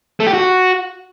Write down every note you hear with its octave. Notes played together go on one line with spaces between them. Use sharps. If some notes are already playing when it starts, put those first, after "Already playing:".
A3
G4
F#4